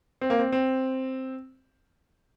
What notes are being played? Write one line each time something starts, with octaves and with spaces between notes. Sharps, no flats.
C4
A#3
C4
C4